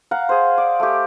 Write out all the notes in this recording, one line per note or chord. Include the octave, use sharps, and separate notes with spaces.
F5 F#5 A#5
G#4 C5
D5
A3 G4